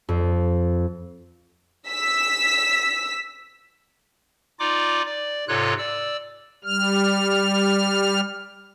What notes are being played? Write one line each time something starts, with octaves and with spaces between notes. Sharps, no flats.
F2
E6 B6
D#4 F4 D5 D6
D5
G#2 C3 F4 A4 C#5 F#6
D5 E6
G3 F6